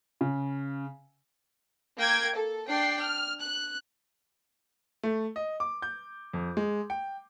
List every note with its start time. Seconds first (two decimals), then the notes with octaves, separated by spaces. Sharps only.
0.21 C#3
1.99 A#3 G5 G#6 D7
2.35 A4
2.69 D4 G5 C7
3.00 F6
3.40 F#6
5.03 A3
5.36 D#5
5.60 D6
5.82 G6
6.33 F2
6.57 G#3
6.90 G5